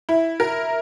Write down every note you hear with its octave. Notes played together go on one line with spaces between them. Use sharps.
E4
A#4